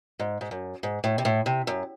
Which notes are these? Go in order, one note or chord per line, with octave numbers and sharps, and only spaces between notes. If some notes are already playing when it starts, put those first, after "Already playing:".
G#2
G#2
F#2
G#2
A2
C3
A2
C3
F#2